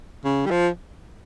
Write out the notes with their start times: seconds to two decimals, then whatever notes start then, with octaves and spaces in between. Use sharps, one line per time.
0.25 C#3
0.46 G3
0.51 F3